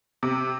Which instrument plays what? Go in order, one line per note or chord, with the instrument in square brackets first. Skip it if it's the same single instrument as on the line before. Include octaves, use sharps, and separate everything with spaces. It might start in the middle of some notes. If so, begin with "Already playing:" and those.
[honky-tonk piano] C3